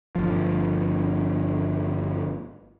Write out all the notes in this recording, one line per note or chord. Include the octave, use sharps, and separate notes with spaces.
G1 F3